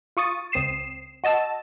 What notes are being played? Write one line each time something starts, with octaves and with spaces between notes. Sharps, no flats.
F4 C#6 D#6 A6
C#2 C4 D#6 C7 E7
F#4 D#5 A5 E6